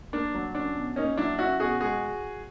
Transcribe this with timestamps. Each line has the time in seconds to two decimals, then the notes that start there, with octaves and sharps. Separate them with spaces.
0.13 A#3 D4
0.34 F#3
0.55 C#4 D4
0.75 B2
0.96 A#3 C#4 D#4
1.17 F#3 D4 E4
1.39 C#4 E4 F#4
1.60 B2 F#4 G#4
1.80 G#3 F#4 G#4